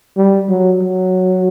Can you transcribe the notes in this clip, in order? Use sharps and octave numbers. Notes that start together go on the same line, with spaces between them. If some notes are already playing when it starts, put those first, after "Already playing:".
G3
F#3
F#3